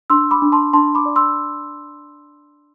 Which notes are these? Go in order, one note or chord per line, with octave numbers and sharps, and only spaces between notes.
D4 C6 E6
B5 D6
D4
A5 C6
D4 A5 C6
B5 D6
D5
C6 E6